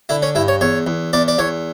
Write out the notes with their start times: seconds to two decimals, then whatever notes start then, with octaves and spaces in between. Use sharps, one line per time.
0.09 D3 E4
0.22 C#4
0.35 G2 E4
0.48 C#5
0.61 E2 C#5
0.87 E2
1.13 E2 D5
1.28 D5
1.38 E2 C#5